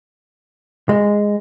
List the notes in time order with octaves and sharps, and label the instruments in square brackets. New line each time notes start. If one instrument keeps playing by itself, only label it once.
[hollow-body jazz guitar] G#3